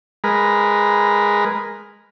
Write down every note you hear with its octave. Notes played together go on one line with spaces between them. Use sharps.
G#3 A#4 B4